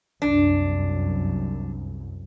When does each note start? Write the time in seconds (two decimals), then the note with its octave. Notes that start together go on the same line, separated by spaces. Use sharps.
0.22 C2 F#2 D4